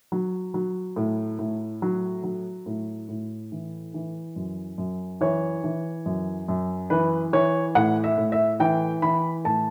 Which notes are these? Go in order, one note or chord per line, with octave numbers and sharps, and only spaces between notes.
F#3
F#3
A2
A2
F#3
F#3
A2
A2
E3
E3
F#2
F#2
E3 C#5
E3
F#2
F#2
E3 B4
E3 C#5
A2 F#5
E5
A2
E5
E3 G5
E3 B5
A2 A5